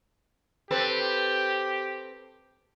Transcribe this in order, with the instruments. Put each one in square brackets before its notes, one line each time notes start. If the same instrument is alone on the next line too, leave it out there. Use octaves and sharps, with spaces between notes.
[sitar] C4 A4 B4 [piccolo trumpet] G4